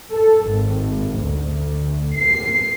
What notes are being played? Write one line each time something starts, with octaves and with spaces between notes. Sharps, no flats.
A4
G#1
D2
C7